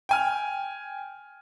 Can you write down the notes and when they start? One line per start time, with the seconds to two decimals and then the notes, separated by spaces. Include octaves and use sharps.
0.09 G5 G#5 F6